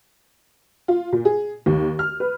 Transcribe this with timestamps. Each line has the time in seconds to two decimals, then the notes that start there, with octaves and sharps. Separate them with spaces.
0.88 F4
1.13 A#2
1.25 G#4
1.66 D#2
1.99 F6
2.20 B4